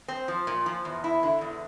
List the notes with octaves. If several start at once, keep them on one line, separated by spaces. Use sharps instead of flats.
C4
F3
A#2
F3
E2
E4
D3
E2